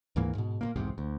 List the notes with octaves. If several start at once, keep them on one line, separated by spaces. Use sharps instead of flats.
D2 G#2 E3 A#3
G#2 B2
A#2 C#3 A#3
B1 E2 G#2 C3
D2